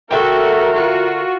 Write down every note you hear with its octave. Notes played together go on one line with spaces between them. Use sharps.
D3 F#4 A4 A#4 E5 G5
F4 F#4